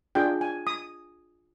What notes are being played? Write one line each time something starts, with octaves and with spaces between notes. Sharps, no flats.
D4 F4 G#4 G5
G#5
D#6